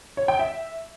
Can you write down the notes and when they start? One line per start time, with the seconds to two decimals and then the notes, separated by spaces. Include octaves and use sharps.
0.17 C#5
0.28 G5
0.39 E5